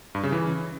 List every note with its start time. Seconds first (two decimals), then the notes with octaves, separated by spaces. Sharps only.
0.15 G2
0.23 C#3
0.32 E3